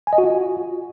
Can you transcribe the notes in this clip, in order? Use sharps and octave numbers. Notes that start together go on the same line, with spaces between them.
G#5
D#5
F#4
F4